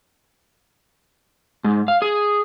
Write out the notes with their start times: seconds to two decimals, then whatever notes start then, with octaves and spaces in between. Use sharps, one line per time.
1.64 G#2
1.88 F5
2.02 G#4